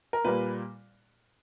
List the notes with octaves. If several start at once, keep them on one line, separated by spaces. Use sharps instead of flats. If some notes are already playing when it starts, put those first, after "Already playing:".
A#4
A#2 G3 A#3 B4